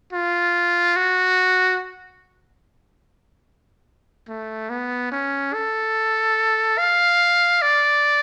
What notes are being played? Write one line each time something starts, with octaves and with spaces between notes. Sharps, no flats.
F4
F#4
A3
B3
C#4
A4
F5
D5